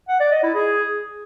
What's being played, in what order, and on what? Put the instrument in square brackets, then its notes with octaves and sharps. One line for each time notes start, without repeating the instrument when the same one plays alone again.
[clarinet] F#5
D5
D#5
E4
G#4